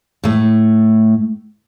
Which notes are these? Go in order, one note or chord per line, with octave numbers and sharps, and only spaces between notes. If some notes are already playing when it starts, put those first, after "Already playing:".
A2 A3